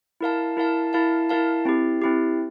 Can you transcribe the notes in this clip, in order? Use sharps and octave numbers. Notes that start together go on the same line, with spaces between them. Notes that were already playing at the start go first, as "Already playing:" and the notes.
E4 A#4 F5 A5
E4 A#4 F5 A5
E4 A#4 F5 A5
E4 A#4 F5 A5
C4 E4 G4
C4 E4 G4